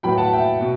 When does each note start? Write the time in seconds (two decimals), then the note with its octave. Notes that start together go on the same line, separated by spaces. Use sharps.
0.03 A2 F#3 B3 G5 B5
0.18 F#5 A5
0.33 E5 G5
0.61 B2